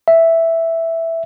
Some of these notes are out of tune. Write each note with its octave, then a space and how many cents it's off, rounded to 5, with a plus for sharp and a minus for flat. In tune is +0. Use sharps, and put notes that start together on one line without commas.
E5 +0